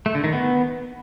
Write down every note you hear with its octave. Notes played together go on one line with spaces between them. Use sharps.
A3
D3
D#3
B3